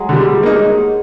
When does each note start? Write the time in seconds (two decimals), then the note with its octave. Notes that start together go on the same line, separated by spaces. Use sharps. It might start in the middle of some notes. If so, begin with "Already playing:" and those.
Already playing: F#3 G#3
0.09 D3 G3
0.27 G3
0.43 A#3 D#4